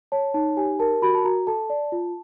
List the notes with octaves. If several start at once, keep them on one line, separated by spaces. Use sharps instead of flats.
C#5 A5
D#4 A5
G4 G#5
A#4 A5
F#4 B5
A5
F#4 A#5
A4 A5
D5
F4